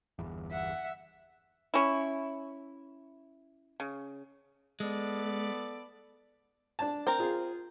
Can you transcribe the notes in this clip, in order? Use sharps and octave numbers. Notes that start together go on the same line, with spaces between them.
G1 E2
E5 F#5
C#4 E4
C#3
G#3 B3 A4 D5
D4 A5
C4 A#4 C5
F4 G#4